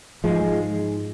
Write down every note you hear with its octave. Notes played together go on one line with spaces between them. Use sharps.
G#2 F3 G#3